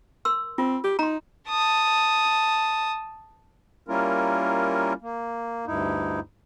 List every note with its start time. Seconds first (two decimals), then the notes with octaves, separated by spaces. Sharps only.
0.25 A#4 C6 E6
0.58 C4 F4
0.84 G4
0.99 D#4 A#5 C6
1.49 A5 D#6
3.88 G3 A#3 C#4 E4 F4 A#4
5.02 A#3
5.67 D2 G2 D#4 E4